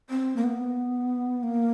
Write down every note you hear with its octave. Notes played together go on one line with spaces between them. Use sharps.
C4
A#3
B3
A#3